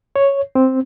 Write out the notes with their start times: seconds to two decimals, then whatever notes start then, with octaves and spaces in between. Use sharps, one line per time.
0.16 C#5
0.55 C4